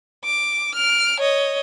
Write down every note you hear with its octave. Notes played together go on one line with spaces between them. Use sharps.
D6
F6 D7
C#5 D#5